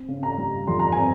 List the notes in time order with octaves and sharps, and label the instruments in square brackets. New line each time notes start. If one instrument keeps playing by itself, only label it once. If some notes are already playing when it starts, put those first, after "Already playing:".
Already playing: [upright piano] C4
C#3
A#5
G3
F2 C6
A#5
C4 G#5